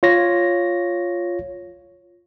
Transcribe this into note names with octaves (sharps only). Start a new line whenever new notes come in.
F4 C#5 A#6